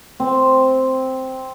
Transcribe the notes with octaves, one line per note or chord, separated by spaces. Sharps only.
C4